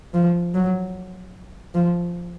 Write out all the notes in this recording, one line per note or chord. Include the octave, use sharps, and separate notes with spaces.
F3
F#3
F3